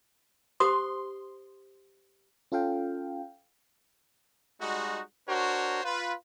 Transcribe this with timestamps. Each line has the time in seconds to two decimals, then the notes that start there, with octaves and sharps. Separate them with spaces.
0.60 G4 C5 C6 D#6
2.52 C#4 F4 A4 F5 G5
4.61 G3 G#3 D#4 F#4
5.28 D4 F#4 A#4 C5 C#5
5.84 F4 B4